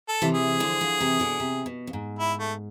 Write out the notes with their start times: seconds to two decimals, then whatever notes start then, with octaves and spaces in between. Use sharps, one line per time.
0.08 A4
0.22 C3 E3
0.34 G#4
0.60 D3 F3
0.81 D3 F3
1.00 C3 E3
1.20 B2 D3
1.40 C3
1.66 B2
1.87 F2
1.93 G#2
2.19 E4
2.39 A3